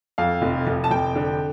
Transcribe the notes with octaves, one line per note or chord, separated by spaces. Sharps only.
F2 F5
F1
F1
A5
F1 G5
D3